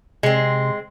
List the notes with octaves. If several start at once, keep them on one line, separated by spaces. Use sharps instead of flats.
C3 G#3 C4